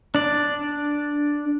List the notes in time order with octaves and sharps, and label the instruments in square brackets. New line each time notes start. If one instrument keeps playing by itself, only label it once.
[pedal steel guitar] D4 D5